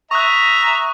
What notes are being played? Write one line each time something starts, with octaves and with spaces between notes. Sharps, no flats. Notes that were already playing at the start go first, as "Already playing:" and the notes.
E5 A#5 C#6 D#6 F#6